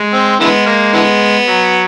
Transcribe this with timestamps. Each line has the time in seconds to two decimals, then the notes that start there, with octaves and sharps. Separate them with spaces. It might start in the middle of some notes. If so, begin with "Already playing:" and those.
Already playing: G#3
0.13 C4
0.40 D3 E3 G#3 B3
0.66 A#3
0.93 D3 E3 B3
1.47 F#3